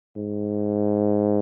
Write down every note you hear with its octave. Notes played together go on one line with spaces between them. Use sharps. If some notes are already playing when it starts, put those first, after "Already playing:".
G#2